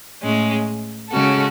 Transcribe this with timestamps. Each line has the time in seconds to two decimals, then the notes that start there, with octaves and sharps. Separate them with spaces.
0.22 A2 G#3 C#4
1.09 C#3 G#3 C#4 F#4 A4